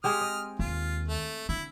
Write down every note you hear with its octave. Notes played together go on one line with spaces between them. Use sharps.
G#3 C4 G4 D#6 F6
D#5
D#2 F4
A3
D3 E4